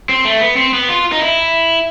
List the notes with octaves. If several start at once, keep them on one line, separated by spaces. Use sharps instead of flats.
C4
A3
B3
C4
B3
F4
D#4
E4